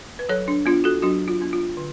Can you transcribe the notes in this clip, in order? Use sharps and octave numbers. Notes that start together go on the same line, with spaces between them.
B4
F#3 A4 C#5
D4
B3 D4 F4
F#4 A4
F#3 D4 F#4
F4
B3 D4
F4
D3